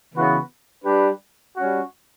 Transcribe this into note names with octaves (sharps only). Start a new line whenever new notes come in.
C#3 E3 B3 F#4 B4
G3 D4 G4 B4
G3 C#4 F#4